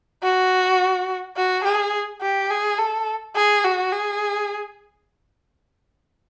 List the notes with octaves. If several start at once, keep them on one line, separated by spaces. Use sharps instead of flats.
F#4
F#4
G#4
G4
G#4
A4
G#4
F#4
G#4